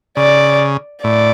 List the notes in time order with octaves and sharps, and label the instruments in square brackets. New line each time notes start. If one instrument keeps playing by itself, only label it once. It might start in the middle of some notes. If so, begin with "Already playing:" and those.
[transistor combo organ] C#3 [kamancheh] D5
[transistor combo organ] A2 [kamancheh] D5